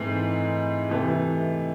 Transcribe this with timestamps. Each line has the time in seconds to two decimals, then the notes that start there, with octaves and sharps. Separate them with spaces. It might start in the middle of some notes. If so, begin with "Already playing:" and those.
Already playing: G#2 E3 A3 C4 E4
0.89 C3 E3 A3